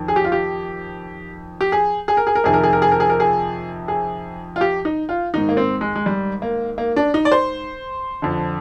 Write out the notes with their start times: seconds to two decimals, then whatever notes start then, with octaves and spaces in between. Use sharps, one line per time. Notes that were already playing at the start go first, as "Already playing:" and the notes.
Already playing: F2 D#3
0.08 G#4
0.16 G4
0.25 F4
0.32 G4
1.61 G4
1.72 G#4
2.08 G#4
2.17 A#4
2.27 G#4
2.35 A#4
2.44 F2 C3 D#3 G#4
2.54 A#4
2.63 G#4
2.73 A#4
2.82 G#4
2.91 A#4
3.00 G#4
3.10 A#4
3.20 G#4
3.88 G#4
4.56 F4
4.61 G4
4.85 D#4
5.09 F4
5.34 G#2 D#3 D#4
5.49 A#3
5.57 C4
5.81 G#3
5.96 G#3
6.06 G3
6.42 A#3
6.78 A#3
6.96 D4
7.14 D#4
7.25 D5
7.32 C5
8.22 F2 D3